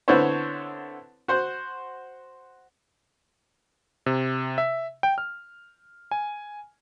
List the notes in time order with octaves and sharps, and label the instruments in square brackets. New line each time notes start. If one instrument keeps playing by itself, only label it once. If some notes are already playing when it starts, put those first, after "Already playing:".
[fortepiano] D3 B3 C4 E4 C5 C#5
F#4 C5 F#5
[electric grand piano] C3
E5
G5
F6
G#5